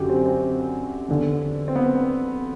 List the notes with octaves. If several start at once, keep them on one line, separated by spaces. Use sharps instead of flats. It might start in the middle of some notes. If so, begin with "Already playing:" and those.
Already playing: F#2 D3 F#4 G4
C4
C4
E2 D3
C4
B3